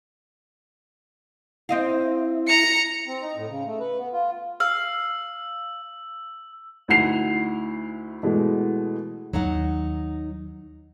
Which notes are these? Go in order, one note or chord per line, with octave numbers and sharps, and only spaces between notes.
C4 E4 D#5 F5
A#5 C#7
C4
D#4
A2
C#3
A3
B4
B3
F4
F5 E6
D2 D#4 E4 F#5 C7 F7
B2 E3 G#3 A3
D#2 F#3 D#4 F#5